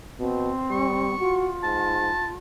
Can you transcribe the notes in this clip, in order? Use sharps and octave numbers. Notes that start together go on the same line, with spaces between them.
B2 C4
G3 C#6
F4 F#4
G#2 A5